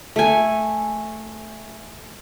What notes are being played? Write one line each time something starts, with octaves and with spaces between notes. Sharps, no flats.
A3 G#5